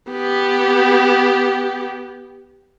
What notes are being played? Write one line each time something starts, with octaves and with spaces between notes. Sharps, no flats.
B3 G4